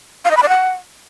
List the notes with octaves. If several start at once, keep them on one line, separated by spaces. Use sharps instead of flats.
F5
D#5
B5
D5
F#5